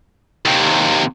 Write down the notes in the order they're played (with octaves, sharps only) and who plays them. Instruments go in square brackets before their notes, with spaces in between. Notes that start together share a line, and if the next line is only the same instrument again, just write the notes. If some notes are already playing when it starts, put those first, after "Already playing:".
[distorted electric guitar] D#2 C3